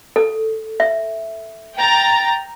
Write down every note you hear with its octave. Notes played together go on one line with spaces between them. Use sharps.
A4
E5
G5 A#5 A6